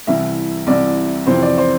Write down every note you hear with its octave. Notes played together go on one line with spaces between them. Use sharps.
C2 C3 E3 E5
C2 C3 E3 D5
F2 C3 E3 C5
D5
C5